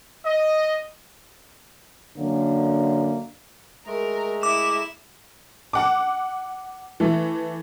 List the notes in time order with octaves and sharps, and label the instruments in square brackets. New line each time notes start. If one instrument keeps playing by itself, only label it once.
[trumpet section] D#5
[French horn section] F#2 D3 F#3 A#3
[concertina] G#3 A3 A#5 [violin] A#4
[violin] E4 E7 [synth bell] D6
[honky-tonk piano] F#5 D6
E3 A3